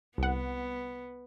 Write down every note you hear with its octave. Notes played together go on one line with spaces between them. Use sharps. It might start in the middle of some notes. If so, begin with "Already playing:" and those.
C2 B3 F#5